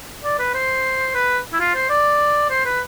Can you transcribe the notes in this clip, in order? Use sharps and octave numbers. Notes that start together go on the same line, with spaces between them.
D5
B4
C5
B4
E4
F4
C5
D5
C5
B4